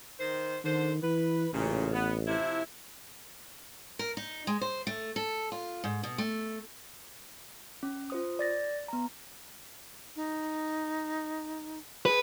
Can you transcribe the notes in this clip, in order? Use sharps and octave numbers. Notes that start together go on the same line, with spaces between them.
D#3 C5
D3 D#3 C5
E3 B4
A1 A#2 C#3
B3
C3 F3 E4
A#4
D#4
G#3
C5
A3
A4
F4
G#2
B2
A3
C#4
F4 C5 D#6
D5 A6 A#6
B3 A#5
D#4
G#4 B4